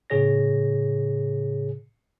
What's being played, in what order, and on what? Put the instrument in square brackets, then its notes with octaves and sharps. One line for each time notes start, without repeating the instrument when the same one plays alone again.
[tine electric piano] A2 C#3 G#4 C#5 A#6